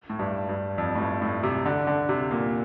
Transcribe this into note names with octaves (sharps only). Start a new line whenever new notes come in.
A2
G2
G2
F2
A2
G2
A2
C3
D3
D3
C3
A#2